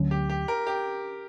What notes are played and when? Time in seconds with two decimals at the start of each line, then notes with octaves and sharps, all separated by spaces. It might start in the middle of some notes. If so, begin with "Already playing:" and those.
Already playing: D2 D3 F#3 C#4
0.11 G4
0.30 G4
0.48 A#4
0.67 G4